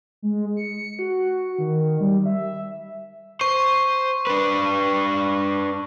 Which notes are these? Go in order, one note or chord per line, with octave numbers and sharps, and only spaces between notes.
G#3
C#7
F#4
D#3
G3
E5
C5 C#6
D4 B4